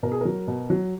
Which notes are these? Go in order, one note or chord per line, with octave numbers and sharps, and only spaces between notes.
B2 A#4
G#4
F#3 A#4
B2
F#3